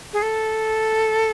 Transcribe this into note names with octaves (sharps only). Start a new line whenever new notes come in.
G#4
A4